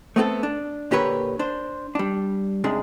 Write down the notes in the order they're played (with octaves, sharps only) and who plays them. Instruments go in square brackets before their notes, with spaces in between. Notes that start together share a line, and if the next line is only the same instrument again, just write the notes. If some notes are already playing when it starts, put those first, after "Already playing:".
[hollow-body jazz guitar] A3 B3 C4 G4 A4
D4
A#2 D3 G4 A#4 B4 C#5
D4 C5
G3 D4
G#2 C3 G#3 D4